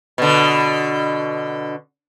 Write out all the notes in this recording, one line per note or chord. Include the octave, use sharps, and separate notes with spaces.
B2 D3